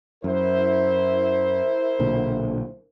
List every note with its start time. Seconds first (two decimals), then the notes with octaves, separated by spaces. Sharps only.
0.24 F#2 E4 A#4 C5
1.99 B1 A#2 D3